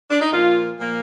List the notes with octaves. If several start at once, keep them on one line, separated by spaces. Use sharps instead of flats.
D4
D#4
A#2 F3 A#3 F4
A#2 F3 A#3